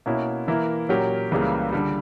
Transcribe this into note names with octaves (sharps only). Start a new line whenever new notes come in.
B2 A#3 C#4 E4
E3 A#3 E4 A#4
A#2 F#3 C#4 G4 A#4
C#2 C#3 E3 G3 A#3
D3 G3